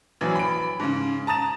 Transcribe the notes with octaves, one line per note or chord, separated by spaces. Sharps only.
A#1 E3 F#3
B5 D7
G#2 C#3
A5 A#5 D#6 A6 E7